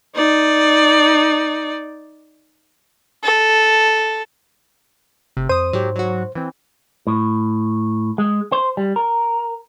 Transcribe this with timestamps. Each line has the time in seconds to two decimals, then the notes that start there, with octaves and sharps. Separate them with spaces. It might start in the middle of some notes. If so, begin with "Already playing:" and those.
0.15 D#4 D5
3.24 A4
5.37 F1 C3
5.49 F2 C5 D#6 D#7
5.73 G#2 F#3 G4
5.96 F#3 F#4
6.35 E3 C4
7.07 A2
8.18 G#3
8.52 C5
8.77 G3
8.96 A#4